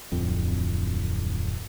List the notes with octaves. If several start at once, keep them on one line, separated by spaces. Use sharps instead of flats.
D1 F2 C4